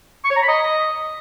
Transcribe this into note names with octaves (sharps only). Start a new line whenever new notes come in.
C#6
C#5
A#5
B5
D#5